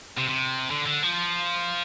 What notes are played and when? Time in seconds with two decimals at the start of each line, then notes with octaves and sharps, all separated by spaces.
0.17 C3
0.28 C3
0.70 D3
0.86 D3
1.03 F3